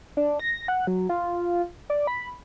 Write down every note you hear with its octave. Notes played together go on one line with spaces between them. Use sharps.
D4
A#6
F#5
F#3
F4
D5
B5